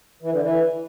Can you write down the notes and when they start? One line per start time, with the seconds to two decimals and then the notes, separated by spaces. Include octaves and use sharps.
0.22 E3
0.32 D3
0.41 E3